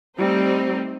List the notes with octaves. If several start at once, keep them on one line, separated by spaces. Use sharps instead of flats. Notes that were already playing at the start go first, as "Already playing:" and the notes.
G3 A3 C4 D#4